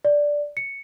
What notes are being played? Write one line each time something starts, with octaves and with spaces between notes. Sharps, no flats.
D5
C#7